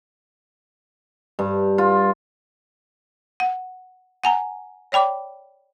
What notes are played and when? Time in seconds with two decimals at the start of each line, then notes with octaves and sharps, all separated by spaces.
1.39 G2
1.78 F4
3.40 F#5
4.24 F#5 G#5 A#5
4.92 C#5 D5 G5 B5 D6